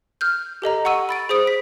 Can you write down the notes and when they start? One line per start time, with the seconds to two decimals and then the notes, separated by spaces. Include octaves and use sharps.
0.21 F6 G6
0.62 G4 A4 D#5 A#5
0.85 F#5 C#6 E6 D#7
1.09 B5 A6 D7
1.29 G#4 C5 D#6 D7
1.47 B6